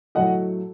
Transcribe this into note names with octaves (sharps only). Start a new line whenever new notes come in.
A2 F#3 A3 D#5 F#5